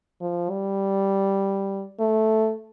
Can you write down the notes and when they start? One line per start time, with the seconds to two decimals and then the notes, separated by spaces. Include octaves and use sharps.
0.21 F3
0.50 G3
1.99 A3